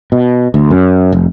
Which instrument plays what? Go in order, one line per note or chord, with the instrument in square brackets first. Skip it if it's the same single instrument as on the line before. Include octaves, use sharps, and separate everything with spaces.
[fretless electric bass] B2
D2
F#2
F1